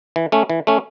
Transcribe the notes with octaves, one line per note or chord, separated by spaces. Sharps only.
E3
A3 C#4
E3
A3 C#4